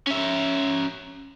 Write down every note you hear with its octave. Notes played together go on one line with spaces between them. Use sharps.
C#4 E5